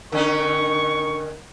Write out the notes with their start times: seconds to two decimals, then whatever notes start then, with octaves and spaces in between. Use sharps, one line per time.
0.12 D3 D#3 C#4 D#4 C#6